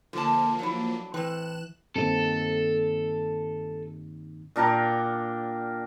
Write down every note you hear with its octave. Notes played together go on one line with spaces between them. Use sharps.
D3 F3 A#3 D4 A5
F#3 D4 E4
A2 E3 C4 F#6 E7
G2 D#3 A#3 C4 A4
A#2 D4 A#4 G5